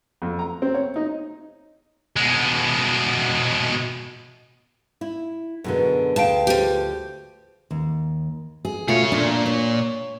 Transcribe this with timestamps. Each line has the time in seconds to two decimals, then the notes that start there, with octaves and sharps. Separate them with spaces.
0.22 F2
0.39 A#5
0.62 C4
0.74 C#5
0.96 D#4
2.16 B2 G#3
5.01 E4
5.64 F#2 B2 D3 G#4 B4
6.16 D2 F5 G5 A5
6.47 F3 G4
7.71 D#2
8.65 G#4
8.88 B2 A3 F4 G#4 C#5
9.12 A#2 D4
9.46 C#5